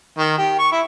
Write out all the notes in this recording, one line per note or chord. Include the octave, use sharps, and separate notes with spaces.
D#3
G4
C#6
E4